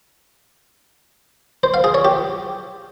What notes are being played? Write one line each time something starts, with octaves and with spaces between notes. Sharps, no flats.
C5
F5
G#4
C#5
G4